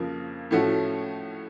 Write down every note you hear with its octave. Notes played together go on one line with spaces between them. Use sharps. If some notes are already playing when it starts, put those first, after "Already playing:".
Already playing: F2 C#3 F3 A#3
A2 F3 A3 C#4 F#4